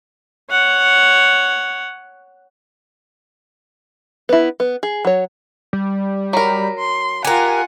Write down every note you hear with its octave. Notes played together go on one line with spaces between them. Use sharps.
C#5 F#5
B3 E4
B3
G#4
F#3 C#5
G3
F#3 A#4 B5
C6
F4 G4 A#4 F#5 G#5